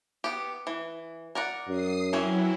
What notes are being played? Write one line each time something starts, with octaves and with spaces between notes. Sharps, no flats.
B3 G4
E3
A#4 D5 F#5
F#2 D#6 C7
E3 F#3 C4 C#4 E4